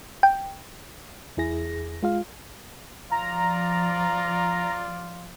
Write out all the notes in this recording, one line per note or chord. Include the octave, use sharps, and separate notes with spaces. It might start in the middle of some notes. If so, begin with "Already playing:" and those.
G5
E2 E4 G#4 A#6
G#3 F4 F5
F3 F4 D5 A#5